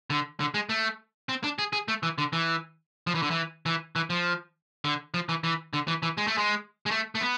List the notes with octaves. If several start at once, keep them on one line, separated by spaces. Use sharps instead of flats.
D3
D3
G#3
A3
C4
D4
G#4
G#4
A3
E3
D3
E3
F3
E3
D3
E3
E3
E3
F3
D3
F3
E3
E3
D3
E3
E3
G#3
A3
G#3
G#3
A3
A3
B3